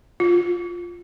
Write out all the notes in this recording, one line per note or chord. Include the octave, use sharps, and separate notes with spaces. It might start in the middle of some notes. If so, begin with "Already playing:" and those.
F4